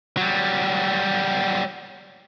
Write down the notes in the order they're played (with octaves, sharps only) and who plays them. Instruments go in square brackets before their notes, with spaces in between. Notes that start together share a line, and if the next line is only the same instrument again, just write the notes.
[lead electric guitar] F#3 G3